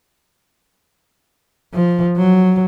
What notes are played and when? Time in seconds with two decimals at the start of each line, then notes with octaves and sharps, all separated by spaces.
1.74 F3
2.17 F#3